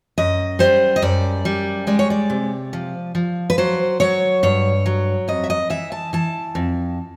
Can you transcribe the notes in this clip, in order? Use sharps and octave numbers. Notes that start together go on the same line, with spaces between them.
F#2 D#5
G3 C5
D#5
F#2 D5
G3
G#3 D5
C#5
D5
C3
F3
F3
B4
F#3 C5
F#3 C#5
G2 C#5
F#3
F2 D#5
E5
D#5
E3 E5
A5
E3 A5
F2